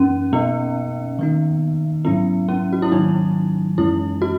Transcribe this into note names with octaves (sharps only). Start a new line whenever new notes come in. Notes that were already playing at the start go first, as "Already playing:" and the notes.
Already playing: F#2 E3 A#3 C#4 D#4 A#4
B2 A#3 B3 D#4 A#4 D#5
D#3 A#3 D#4
G#2 F#3 B3 C#4 E4
C#4
F#4
E4
G#2 D#3 F#3 A#3 D#4
F#2 E3 G#3 C#4 E4
F#4